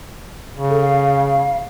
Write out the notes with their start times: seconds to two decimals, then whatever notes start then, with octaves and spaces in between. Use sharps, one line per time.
0.55 C#3
0.70 A4
0.82 F5